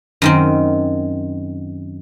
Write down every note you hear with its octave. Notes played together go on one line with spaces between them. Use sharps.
F#2 D#3 C4